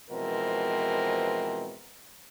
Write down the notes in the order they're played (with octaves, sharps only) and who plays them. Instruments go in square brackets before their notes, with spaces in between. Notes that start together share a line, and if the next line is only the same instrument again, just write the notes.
[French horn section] B2 E3 F3 G#3 C4 A#4